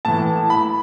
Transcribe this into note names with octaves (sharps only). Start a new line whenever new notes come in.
A2 E3 A5
B5